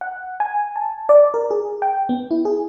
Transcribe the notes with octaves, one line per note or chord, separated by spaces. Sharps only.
F#5
G#5
A5
D5
A#4
G#4
G5
B3
E4
G#4